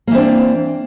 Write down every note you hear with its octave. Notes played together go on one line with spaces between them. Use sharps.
E3 A#3 C4 D4